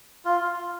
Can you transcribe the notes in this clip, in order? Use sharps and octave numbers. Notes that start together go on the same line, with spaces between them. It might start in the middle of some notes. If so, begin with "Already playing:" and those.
F4